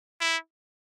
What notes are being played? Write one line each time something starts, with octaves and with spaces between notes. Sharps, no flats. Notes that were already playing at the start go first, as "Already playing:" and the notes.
E4